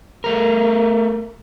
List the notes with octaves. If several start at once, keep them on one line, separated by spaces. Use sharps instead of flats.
A3 A#4